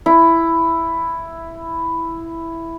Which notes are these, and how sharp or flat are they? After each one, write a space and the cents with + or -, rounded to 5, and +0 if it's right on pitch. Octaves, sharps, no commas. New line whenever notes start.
E4 +5